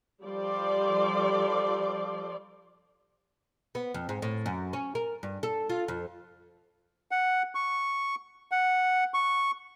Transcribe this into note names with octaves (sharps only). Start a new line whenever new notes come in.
F3 G3 A4 D5 C6
B3
F2
G#2
A2
F#2
C#4
A#4
G2
A4
F4
F2
F#5
C#6
F#5
C#6